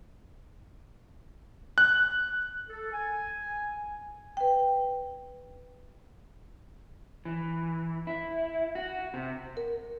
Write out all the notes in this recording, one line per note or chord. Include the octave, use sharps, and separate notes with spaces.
F#6
A4
G#5
B4 G5
E3
E4
F#4
C3
A#4